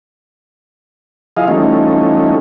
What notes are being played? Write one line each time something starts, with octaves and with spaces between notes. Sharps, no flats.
F3 E4 G#4 D#5 F5
E3 F3 G3 A3 C#4 D#4